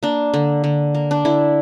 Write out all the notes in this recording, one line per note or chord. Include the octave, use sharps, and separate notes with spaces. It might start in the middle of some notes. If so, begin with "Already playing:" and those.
A#3 D4
D3
D3
A#3
D4
D3 E4